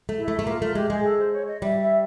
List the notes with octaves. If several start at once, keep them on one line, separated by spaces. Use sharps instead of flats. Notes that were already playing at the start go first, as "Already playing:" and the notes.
A3
E4
A3
A3
A#3 F4
A3 F4
G#3 G4
G#3 G#4
A4
C5
C#5
D#5
G3 E5
E5